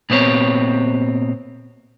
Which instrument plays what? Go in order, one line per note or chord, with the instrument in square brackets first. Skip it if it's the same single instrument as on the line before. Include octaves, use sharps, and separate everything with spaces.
[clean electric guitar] A#2 B3 C4 C#5